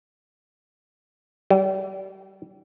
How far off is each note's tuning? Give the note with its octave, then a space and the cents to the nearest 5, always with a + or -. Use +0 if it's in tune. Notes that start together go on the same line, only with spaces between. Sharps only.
G3 -35